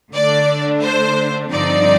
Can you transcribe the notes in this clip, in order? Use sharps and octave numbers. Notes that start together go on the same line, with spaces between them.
D3 A3 D4 D5
C5
G2 D3 F3 C4 D#4 D5